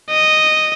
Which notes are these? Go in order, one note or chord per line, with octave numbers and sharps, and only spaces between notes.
D#5